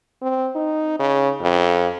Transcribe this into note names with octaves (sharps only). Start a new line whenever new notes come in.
C4
D#4
C#3
F2